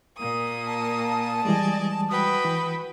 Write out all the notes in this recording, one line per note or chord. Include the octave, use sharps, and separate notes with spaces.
A#2 A#3 D#6
A5
E3 G3 G#3 D5 D#5 G#5
F#4 B4 G5 D#6
E3